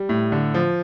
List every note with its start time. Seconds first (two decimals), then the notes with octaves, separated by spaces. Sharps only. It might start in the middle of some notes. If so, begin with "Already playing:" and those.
Already playing: G3
0.09 A2
0.32 D3
0.54 F3